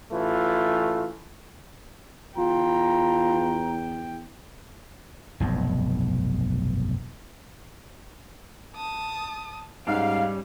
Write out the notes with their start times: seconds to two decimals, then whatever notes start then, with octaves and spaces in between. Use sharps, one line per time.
0.12 A1 E3 A3 F4
2.37 E2 F4 G5 A#5
5.40 F1 B1 G2
8.76 A5 D#6
9.87 G#2 G3 C#4 F5